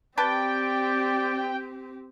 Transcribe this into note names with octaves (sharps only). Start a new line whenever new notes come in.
C4 G4 B4 D5 G5 A5